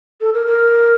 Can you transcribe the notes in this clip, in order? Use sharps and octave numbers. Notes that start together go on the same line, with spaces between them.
A4
A#4
A#4